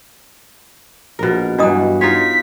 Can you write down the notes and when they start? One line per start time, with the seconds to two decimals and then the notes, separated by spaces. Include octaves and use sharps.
1.19 A#1 B2 A#4
1.58 G2 E3 F#3 D4 D#5 D#6
2.01 D#4 F4 C#5 B6